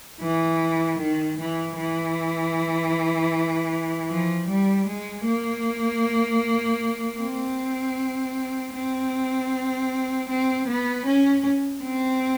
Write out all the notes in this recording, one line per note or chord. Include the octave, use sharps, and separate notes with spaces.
E3
D#3
E3
E3
F3
G3
G#3
A#3
C4
C4
C4
B3
C#4
C4